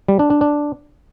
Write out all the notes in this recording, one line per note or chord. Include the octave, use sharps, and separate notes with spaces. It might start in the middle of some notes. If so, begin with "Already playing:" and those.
G3
D4
D4
D4